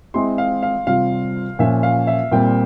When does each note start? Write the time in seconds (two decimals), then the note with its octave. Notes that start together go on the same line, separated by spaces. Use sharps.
0.14 G#3 C4 E4 G#4 C6
0.38 F5
0.63 F5
0.87 C3 G3 C4 F4 F5
1.59 A#2 F3 A#3 C#4 E5
1.83 F5
2.07 E5
2.32 A#2 G3 C4 G5